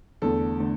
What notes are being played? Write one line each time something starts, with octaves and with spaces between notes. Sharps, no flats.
E2 D3 A3 A4
D3 A3